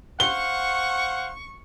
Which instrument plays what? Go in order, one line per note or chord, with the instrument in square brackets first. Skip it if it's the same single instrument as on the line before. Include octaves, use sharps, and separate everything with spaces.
[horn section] C5 F5 F#5 [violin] C#6 [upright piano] G7